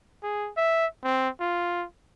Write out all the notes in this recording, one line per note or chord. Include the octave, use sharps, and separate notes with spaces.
G#4
E5
C4
F4